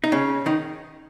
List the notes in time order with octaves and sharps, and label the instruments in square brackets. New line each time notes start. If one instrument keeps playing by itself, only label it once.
[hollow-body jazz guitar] D#4
C#3 C#4
D#3 D#4